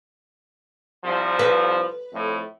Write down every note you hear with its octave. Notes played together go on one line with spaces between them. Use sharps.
C2 F3
B4
F2 A2